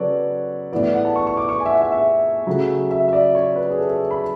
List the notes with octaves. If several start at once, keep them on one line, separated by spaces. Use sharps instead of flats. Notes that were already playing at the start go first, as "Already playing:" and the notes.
Already playing: C#3 F#3 A4 B4 C#5 D5
A2 E3 B3 D5
D5
F#5
A5
C#6
C#6
D6
C#6
G#5
E5
F#5
E5
E5
C#3 F#3 A3
E5
E5
D5
C#5
B4
G#4
A4
A4
B5